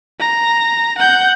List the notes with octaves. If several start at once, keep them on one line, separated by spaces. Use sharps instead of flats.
A#5
F#5 G6